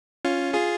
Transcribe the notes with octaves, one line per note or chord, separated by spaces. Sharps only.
C#4 F4
F4 G#4